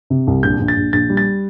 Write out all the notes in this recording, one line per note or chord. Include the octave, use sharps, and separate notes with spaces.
C3
C2
A#1 G6
A#1
A6
A#1
A#1 A6
G3
A6